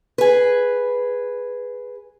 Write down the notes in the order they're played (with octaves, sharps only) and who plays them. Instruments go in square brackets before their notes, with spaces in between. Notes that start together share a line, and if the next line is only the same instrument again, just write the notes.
[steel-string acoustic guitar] G#4 B4